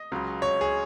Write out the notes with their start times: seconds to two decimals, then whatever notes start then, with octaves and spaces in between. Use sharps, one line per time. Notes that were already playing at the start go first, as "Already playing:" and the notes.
Already playing: D#5
0.12 C#2 C#3 F#3
0.42 C#5
0.61 G#4